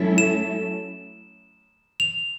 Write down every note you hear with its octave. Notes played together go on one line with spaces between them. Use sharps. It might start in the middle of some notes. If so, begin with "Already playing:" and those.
Already playing: F#3 A3 C#4 E4 A4
E7
F7